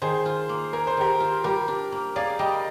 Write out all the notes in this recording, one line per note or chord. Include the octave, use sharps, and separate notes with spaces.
D#3 G#4 C5
F4
A#3
G#4 A#4
C5
D#3 G4 A#4
F4
G3 G4 A#4
D4
A#3
G#4 D5 F5
G3 D#5 G5